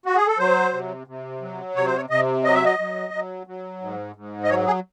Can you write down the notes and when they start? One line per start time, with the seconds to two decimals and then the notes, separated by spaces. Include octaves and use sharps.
0.05 F#4
0.16 G#4
0.27 A4
0.38 F#3 C5
0.73 C3
1.07 C3
1.41 F#3
1.76 C3 C#5
1.86 C5
1.96 C#5
2.10 C3 D#5
2.44 F#3 D#5
2.55 E5
2.65 D#5
2.79 F#3
3.13 F#3
3.47 F#3
3.81 G#2
4.16 G#2
4.44 D#5
4.50 F#3 C#5
4.67 G#4